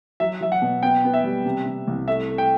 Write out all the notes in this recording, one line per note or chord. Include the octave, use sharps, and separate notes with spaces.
F#3 E5
F#3 E5
F#5
B2
B3 G5
B3
E5
G3
C3
C3
C2
A3 E5
A3
G5